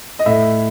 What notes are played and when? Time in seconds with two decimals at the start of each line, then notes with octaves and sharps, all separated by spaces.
0.19 D#5
0.26 A2 E5